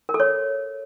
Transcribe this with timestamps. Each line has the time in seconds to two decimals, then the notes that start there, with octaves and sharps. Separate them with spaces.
0.09 A#4
0.14 A4
0.20 C#5